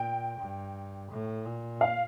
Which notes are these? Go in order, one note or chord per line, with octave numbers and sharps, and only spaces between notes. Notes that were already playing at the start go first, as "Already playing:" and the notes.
Already playing: A#2 G5
G2
A2
A#2
F5